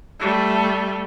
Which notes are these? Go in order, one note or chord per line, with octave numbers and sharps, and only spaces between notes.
G3 A3